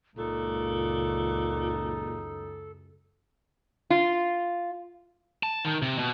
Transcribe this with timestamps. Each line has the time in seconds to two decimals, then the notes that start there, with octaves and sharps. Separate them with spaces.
0.17 C#2 F#2 A#2 C#3 D#4 A4
3.90 F4
5.43 A5
5.65 D#3
5.82 C3
5.99 B2